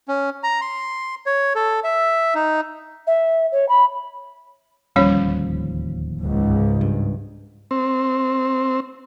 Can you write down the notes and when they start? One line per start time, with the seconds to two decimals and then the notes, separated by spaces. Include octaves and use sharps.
0.08 C#4
0.43 A#5
0.61 C6
1.26 C#5
1.55 A4
1.84 E5
2.35 D#4
3.07 E5
3.52 C#5
3.69 B5
4.96 D1 D#2 F3 G3 C#4 C#5
6.19 C#2 G#2
6.81 G2
7.71 C4